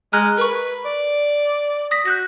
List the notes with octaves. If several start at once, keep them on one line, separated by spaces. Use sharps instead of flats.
G#3 A#5 F6 F#6
A#4 B4 C#6
D5
D#6 A#6 B6
F#4 F#6 G6 A#6